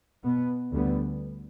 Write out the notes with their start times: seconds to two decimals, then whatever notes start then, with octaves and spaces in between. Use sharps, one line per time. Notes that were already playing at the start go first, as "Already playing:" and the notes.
0.23 B2 B3
0.71 D2 D3 G3 B3